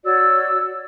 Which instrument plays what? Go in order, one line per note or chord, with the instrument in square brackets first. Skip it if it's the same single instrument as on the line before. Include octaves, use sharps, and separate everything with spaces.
[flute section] F#4 C#5 D5 E6